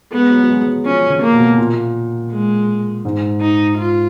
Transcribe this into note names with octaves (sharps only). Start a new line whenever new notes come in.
G#3 B3
F#3
F#3
G#3
G#3
F#3
F3 C#4
C#3
A#3
B2
A#2
G#3
G#2
D#4
F4